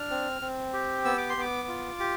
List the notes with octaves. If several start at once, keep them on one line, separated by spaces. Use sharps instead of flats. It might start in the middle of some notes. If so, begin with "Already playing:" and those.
Already playing: D4 F6
C4
C4
G4
B3 E6
D6
C6
B3 D6
F4
G4